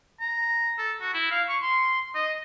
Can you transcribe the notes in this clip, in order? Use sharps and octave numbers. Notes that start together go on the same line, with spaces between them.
A#5
A4
F#4
E4
F5
C#6
C6
D#5